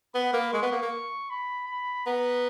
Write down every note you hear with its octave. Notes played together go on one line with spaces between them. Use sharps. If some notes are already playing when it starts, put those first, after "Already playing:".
B3 B5
A#3
G#3 C#6
B3
A#3
A#3
B5
B5
B3 A#5